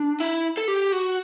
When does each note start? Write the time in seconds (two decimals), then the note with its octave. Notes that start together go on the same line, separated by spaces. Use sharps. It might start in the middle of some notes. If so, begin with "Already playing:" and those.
Already playing: D4
0.20 E4
0.57 A4
0.68 G4
0.92 F#4